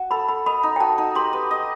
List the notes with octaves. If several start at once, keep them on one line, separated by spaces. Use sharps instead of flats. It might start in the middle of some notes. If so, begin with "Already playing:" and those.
Already playing: F#4
A4 B5
A4 B5
D#5 B5
D#4
G5
F#4 A5
D#4
G4 C6
B4
D#5